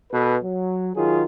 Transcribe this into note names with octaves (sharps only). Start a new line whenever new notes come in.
B2 A4 B4
F#3
D#3 F#3 F4 G#4